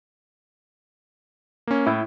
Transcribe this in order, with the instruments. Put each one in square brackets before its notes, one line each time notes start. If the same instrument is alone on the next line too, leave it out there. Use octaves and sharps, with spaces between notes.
[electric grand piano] A#3 C#4
[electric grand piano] A2 [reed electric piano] E4